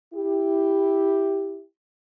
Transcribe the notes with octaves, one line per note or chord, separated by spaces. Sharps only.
E4 G4